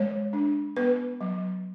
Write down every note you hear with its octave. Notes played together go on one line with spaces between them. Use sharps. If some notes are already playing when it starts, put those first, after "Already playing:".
Already playing: G#3 C#5
D4
B3 B4
F#3